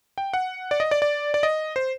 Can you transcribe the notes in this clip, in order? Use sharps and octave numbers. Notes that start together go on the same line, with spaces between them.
G5
F#5
D5
D#5
D5
D5
D5
D#5
C5